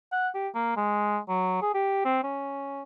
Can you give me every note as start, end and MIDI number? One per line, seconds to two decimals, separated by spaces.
0.12 0.28 78
0.34 0.48 67
0.55 0.72 58
0.76 1.19 56
1.29 1.59 54
1.61 1.72 68
1.74 2.00 67
2.05 2.22 60
2.24 2.82 61